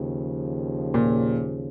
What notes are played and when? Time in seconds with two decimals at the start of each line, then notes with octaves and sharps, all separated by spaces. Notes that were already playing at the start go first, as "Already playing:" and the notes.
Already playing: D#2 C#3 F3
0.94 A#2